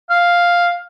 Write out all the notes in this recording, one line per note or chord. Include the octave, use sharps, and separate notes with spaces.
F5